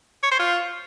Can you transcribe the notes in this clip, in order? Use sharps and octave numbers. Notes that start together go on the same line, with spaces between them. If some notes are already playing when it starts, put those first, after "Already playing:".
C#5
C5
F4